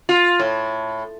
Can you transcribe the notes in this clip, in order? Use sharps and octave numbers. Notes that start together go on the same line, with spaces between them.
F4
A2